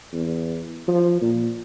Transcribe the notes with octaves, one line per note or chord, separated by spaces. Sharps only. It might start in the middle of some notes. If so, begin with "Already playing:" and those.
E2
F3
A#2